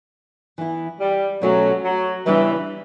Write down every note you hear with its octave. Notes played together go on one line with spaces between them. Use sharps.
E3 B3 E4
G3
B2 F#3 A3 C#4 F#4
F#3
C#3 E3 G3 B3 D4